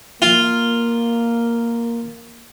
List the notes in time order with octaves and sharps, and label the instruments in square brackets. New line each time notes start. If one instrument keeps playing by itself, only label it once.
[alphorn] A#3 [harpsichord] F4